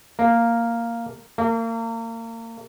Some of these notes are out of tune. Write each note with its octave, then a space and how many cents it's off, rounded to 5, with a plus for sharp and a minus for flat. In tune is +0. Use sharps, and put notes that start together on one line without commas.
A#3 -5
A#3 -35